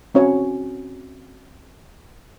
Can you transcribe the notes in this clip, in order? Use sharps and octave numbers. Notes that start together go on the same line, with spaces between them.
C4 C#4 F#4 C#5